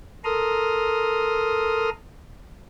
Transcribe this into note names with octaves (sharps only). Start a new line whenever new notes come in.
A4 A#4 A#5 C6 D#6 F6